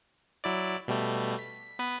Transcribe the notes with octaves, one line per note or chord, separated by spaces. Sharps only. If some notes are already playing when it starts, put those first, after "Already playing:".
F#3 E4 D5
B2 G3 A3
B6
B3 B4